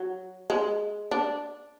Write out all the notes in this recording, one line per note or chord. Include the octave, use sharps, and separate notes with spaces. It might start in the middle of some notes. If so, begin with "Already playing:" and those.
Already playing: F#3
G#3
D4